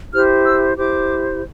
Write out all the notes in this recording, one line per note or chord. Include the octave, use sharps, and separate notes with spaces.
E4 G4 C5 F6
E6
E4 G4 C5 D6